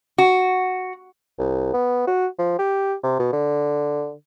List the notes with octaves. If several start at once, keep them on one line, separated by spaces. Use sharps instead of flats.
F#4
C2
B3
F#4
F3
G4
C3
B2
D3